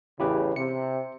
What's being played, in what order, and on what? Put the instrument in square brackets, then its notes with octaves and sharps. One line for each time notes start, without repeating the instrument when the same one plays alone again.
[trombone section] A1 E2 C#3 [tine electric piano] E4 G4 B4
[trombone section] C3 [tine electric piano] C#7